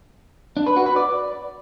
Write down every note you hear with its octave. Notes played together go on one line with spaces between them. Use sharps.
D4
B4
F#4
B4
D5